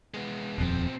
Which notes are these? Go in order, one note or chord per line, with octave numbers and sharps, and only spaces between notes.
G#3 B3
D#1 F2 B2 C4